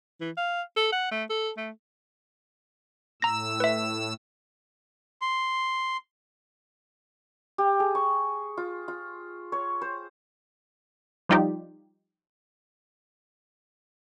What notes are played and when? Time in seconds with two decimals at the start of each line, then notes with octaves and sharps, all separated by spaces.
0.21 E3
0.37 F5
0.77 A4
0.93 F#5
1.12 A3
1.30 A4
1.58 A3
3.22 A2 A#5 E6 A#6
3.60 B4 E5
5.22 C6
7.58 G4
7.80 G#4
7.95 C#6
8.57 F4
8.88 F4
9.52 C#5
9.82 C5
11.29 F3 G3 D#4 F4 G4 D5